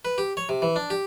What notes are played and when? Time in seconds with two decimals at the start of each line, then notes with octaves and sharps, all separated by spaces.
0.05 B4
0.18 G4
0.37 C#5
0.49 C3
0.62 E3
0.76 D4
0.90 G4